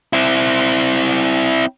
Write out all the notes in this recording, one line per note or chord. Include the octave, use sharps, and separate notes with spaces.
C4 E4